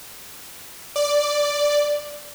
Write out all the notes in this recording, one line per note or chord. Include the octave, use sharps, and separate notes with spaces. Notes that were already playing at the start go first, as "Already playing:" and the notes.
D5